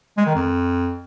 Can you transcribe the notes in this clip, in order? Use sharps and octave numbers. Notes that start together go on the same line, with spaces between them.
G#3
D#3
F2